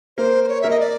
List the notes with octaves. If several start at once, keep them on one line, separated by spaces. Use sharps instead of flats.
A#3 A#4 C5
C5
C#5
A#3 A#4 E5
D#5
D5